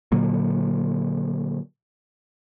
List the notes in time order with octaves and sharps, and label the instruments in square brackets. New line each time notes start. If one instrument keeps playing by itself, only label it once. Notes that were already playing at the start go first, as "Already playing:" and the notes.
[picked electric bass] A#2 D3 F#3 A#3